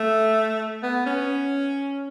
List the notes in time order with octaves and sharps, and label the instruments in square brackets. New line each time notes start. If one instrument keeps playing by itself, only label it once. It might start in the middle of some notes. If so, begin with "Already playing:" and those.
Already playing: [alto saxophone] A3
B3
C#4